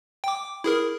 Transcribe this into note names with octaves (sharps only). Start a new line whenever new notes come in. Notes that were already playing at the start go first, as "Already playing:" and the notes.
G5 D6
E4 G#4 A#4